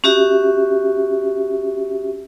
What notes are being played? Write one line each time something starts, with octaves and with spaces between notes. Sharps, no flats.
C#4 F#4 G4 E5